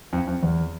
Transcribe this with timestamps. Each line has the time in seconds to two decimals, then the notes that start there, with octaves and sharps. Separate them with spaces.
0.13 F2
0.27 F2
0.43 E2